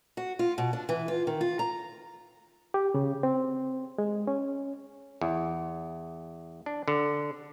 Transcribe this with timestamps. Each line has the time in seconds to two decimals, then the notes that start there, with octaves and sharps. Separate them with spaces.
0.17 F#4
0.39 F4
0.58 B2
0.73 D4
0.89 E3
1.08 F4
1.27 D#3
1.41 F4
1.59 A#5
2.74 G4
2.94 C#3
3.23 C4
3.98 G#3
4.27 C#4
5.21 E2
6.66 D4
6.88 D3